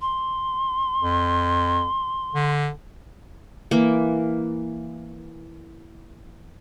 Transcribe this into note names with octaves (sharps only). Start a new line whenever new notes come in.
C6
F2
D3
E3 A#3